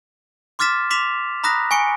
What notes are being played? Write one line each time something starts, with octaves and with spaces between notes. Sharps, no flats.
C6 D6 F6 A6 B6 E7
C6 D6 B6 E7 F7
A#5 B5 D#6 F#6 A#6 B6
G#5 C#6 C#7 D7